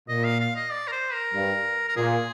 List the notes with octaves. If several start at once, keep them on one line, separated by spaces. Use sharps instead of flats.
A#2 D#5
F5
F5
D#5
D5
A#4
C5
A#4
G2
A#4
A#2 G#4